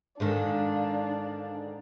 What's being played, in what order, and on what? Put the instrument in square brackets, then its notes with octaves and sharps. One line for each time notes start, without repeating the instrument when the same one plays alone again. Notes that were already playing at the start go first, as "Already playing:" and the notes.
[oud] G#2 D3 D#3 [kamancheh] D4 F5